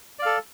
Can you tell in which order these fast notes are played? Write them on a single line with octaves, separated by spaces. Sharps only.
D5 F5 A4